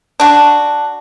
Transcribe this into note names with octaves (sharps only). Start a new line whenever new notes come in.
D4 F#4